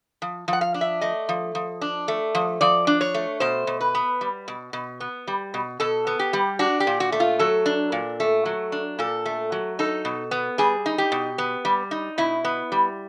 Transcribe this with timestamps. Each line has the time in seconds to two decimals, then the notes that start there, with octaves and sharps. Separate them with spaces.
0.22 F3
0.48 F3
0.53 F#5
0.61 F5
0.74 D4
0.81 E5
1.01 A3 D#5
1.29 F3
1.55 F3
1.81 D4
2.08 A3
2.35 F3
2.61 F3 D5
2.87 D4
3.01 C#5
3.14 A3
3.40 B2 C5
3.67 B2
3.81 B4
3.95 B3
4.21 G3
4.48 B2
4.73 B2
5.00 B3
5.28 G3
5.54 B2
5.80 B2 A4
6.07 B3
6.19 G4
6.33 G3
6.59 D4 F#4
6.80 G4
6.87 A#2
7.00 F#4
7.12 A3
7.20 F4
7.39 F#3 A4
7.66 D4
7.92 A#2
8.20 A3
8.46 F#3
8.72 D4
8.99 A#2 A4
9.26 A3
9.52 F#3
9.79 D#4 A4
10.05 B2
10.31 B3
10.58 G3 G#4
10.86 D#4
10.98 G4
11.12 B2
11.38 B3
11.65 G3
11.91 D#4
12.18 B2 E4
12.45 B3
12.72 G3